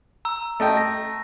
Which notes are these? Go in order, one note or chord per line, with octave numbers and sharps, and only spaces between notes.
A#5 E6
A3 D#5 G5
A#6